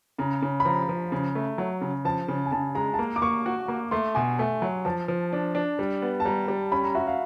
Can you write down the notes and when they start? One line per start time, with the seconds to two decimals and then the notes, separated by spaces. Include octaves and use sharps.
0.18 C#3 A#5
0.42 C#3
0.60 B5
0.65 F3 A#5
0.89 F3
1.12 C#3
1.35 A3
1.58 F#3
1.81 C#3
2.05 F3 A5
2.28 C#3
2.46 G#5
2.52 C#3 A5
2.75 G#3 A#5
2.94 A5
2.99 A#3 A#5
3.16 D6
3.22 A#3 C#6
3.46 F#4
3.68 A#3
3.91 A3 C6
4.15 B2 G#5
4.39 A3 G#5
4.62 F#3
4.85 F3 A5
5.08 F3
5.33 D4
5.55 D4
5.79 G3
6.02 B3
6.20 A5
6.25 G3 A#5
6.48 G3
6.72 C#4 B5
6.83 A#5
6.95 F#4 E5
7.07 F5